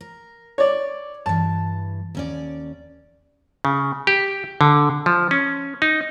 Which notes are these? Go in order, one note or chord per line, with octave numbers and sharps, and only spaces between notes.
A#4
C#5 D5
G2 E3 A5
D#2 C#4 D5
C#3
G4
D3
F3
C#4
D#4